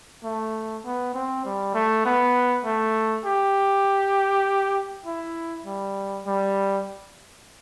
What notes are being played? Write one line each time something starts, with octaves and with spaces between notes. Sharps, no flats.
A3
B3
C4
G3
A3
B3
A3
G4
E4
G3
G3